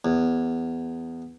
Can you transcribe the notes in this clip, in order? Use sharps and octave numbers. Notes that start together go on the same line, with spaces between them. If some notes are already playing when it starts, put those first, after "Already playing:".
E2